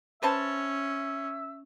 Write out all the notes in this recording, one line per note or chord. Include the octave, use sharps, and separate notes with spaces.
C#4 B4 C5 E5 A5